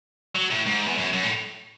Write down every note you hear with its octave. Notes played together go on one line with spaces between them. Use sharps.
F#3
A2
G#2
E2
F#2
F#2
A2